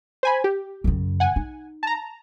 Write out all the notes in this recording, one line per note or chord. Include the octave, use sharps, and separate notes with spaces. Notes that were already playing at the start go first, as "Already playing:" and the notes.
C5 G#5 B5
G4
F#2 C#3
F#5 G#5
D#4
A5 A#5